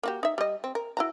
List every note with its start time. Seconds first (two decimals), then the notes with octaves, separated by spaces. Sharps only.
0.03 A#3 F#4 G4
0.23 D#4 E5
0.38 G3 D#5
0.64 C4
0.75 A#4
0.97 E4 F#4 A#5